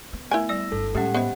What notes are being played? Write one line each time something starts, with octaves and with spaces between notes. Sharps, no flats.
B3
A3 E4 A#4 G#5
G3 D5 E6 A#6
G1 A4
A2 G3 G#3 C#4 G4 F#5
B3 C5 D#5 E5